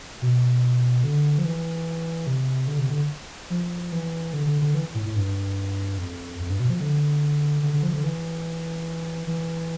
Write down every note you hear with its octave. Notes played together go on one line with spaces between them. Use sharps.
B2
D3
F3
E3
C3
D3
C3
D3
F3
E3
D3
D3
D3
E3
A2
A2
G2
F2
F2
G2
B2
F3
D3
D3
D3
F3
D3
E3
E3